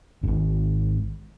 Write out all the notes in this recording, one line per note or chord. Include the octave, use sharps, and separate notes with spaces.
D#1 G#1